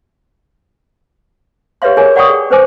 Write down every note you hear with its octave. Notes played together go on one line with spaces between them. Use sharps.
G4 B4 C#5 E5 F5 C6
F4 G#4 A#4 C#5 G#5
D5 F#5 G5 B5 C#6 D#6
G#4
C#4 B4 C5 G#5 D6